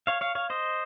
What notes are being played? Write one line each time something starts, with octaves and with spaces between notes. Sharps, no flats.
C#5 F5
C#5 F5
C#5 F5
C5 D#5